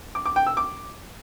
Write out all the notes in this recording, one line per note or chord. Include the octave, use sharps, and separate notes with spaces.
D6
D6
G5
E6
D6